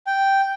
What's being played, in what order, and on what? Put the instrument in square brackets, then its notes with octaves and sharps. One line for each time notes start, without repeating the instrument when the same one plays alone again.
[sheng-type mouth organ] G5